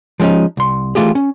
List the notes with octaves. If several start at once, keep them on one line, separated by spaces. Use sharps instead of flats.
F3 G#3 C4 C#4 D#4
C2 C6
E3 F#3 A3 F4 G4 G#4
C#4